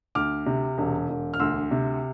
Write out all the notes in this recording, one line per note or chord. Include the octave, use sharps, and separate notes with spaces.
D2 D6 F6
C3
E1
E1
F6
D2 C6 E6
C3